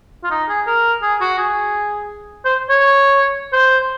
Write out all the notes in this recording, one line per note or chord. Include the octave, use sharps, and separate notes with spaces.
F4
D#4
G#4
A#4
G#4
F#4
G#4
C5
C#5
C5